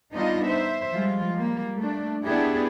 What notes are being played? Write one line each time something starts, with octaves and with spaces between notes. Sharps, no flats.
G3 B3 D4 D#4 F4 D#5
C5 E5
F3 G3 G#3 F4
G3 A#3
A3 D4
B3 D4 E4 G4 G#4